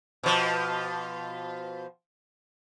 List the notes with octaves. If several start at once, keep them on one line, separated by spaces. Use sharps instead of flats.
B2 F3